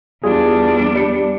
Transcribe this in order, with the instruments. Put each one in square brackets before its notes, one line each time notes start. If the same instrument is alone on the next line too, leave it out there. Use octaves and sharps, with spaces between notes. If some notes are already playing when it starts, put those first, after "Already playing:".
[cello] E2 D4 [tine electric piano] G3 F4 G#4
[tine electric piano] G3 C#7